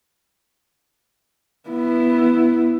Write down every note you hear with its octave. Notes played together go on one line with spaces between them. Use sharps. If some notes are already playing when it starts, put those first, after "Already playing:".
B3 E4